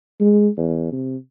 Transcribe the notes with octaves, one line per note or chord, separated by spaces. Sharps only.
G#3
E2
C3